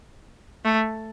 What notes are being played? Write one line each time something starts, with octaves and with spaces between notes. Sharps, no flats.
A3